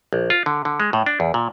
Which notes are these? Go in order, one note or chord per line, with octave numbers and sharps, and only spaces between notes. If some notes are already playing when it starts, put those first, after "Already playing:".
A#1
F4
D3
D3
G#3
A2
D4
E2
A#2